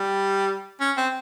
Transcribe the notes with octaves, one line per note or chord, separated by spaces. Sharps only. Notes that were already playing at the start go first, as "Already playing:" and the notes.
Already playing: G3
C#4
C4